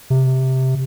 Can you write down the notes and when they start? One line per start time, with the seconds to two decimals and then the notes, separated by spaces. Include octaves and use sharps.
0.10 C3